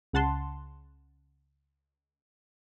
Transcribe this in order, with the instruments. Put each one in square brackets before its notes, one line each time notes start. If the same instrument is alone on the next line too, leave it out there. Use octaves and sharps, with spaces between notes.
[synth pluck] C#2 C#3 F#5 A5 C6